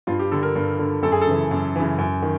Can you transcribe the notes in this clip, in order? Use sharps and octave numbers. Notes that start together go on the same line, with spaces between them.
G2 F4
G4
D3 A4
A#4
G2
D3
F#2 A4
G#4
A4
C#3 E3
F#2
C#3 E3
F#2
D#3